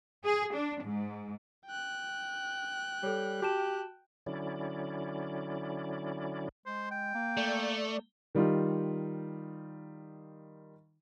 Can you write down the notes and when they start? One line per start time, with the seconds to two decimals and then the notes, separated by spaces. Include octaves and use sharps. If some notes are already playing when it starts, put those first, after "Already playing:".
0.25 G#4
0.54 D4
0.83 G#2
1.66 G5 F#6
3.03 G3 A4 C#5
3.42 F#4 G4 A5 E7
4.26 D3 F#3 C#4 E4 D5
6.66 G#3 C5
6.91 G5
7.15 A#3
7.37 A3 D5
8.35 D#3 G3 D#4 F4